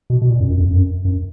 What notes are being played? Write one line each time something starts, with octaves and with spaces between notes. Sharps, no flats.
B2
B2
A#2
F#2
F#2
F2
F#2
F#2